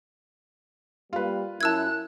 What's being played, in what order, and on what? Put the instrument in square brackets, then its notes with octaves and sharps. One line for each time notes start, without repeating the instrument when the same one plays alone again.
[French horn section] G3 A#3 [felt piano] F4 B4
[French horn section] F#2 E4 [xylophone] A5 E6 G#6 [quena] F#6